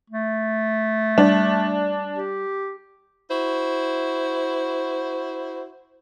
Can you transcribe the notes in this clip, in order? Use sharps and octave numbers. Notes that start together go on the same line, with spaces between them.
A3
G3 D4
G4
E4 F#4 C5